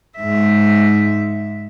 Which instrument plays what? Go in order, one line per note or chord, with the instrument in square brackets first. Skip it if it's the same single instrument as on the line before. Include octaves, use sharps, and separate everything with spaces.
[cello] G#2 E5